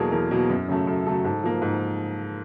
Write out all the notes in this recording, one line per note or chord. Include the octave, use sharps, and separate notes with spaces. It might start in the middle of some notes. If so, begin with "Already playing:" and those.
Already playing: E2 B2 F#3 A#3 G#4 A4
E2 A#4
B2 F#3 A#3
F#2
C#3 F#3 A3
F#2 A4
C#3 F#3 A3 A4
G#2 A4
F3 A#3
G#2